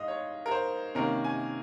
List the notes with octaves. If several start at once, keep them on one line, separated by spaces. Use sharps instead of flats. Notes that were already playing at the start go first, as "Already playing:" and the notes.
Already playing: G#2 D#5 F5
C#5
A#4
C5
C3 D#3 A#3 C#4 A#4
G#5